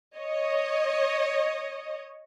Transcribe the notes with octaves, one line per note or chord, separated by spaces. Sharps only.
C#5 D#5